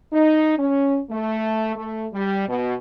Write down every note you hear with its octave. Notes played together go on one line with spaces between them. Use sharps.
D#4
C#4
A3
A3
G3
B2